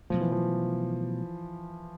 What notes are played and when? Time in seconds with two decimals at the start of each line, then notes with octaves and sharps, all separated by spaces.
0.10 B2 F3 F#3 A3
0.21 E3
0.32 F3